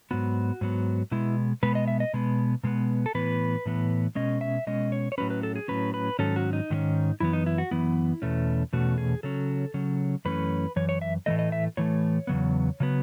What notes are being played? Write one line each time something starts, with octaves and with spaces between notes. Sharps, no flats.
G#2 F#3 B3 F#4
G#2 F#3 B3
B2 G#3 B3 E4
B2 G#3 B3 B4
D#5
E5
D#5
B2 G#3 B3
B2 G#3 B3
A4
A2 E3 B3 B4
A2 E3 B3
B2 G#3 C#4 D#5
E5
B2 G#3 C#4 D#5
C#5
C#5
A2 F#3 C#4 B4
B4
A4
G#4
A2 F#3 C#4 B4
B4
G#2 D#3 F#3 C#4 A4
F#4
D#4
G#2 D#3 F#3 C#4
F#2 E3 B3 E4
D#4
E4
F#4
F#2 E3 B3 E4
E2 B2 A3 C#4
E2 B2 A3 C#4 F#4
G#4
C#3 F#3 C#4 A4
C#3 F#3 C#4
F#2 E3 A3 C#4 B4
F#2 E3 C#5
C#5
E5
A2 E3 A3 D#5
D#5
E5
A2 E3 A3 C#5
E2 C#3 F#3 B3
C#3 F#3 B3